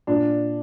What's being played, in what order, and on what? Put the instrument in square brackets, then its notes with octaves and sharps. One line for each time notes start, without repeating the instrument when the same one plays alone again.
[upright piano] A#2 D4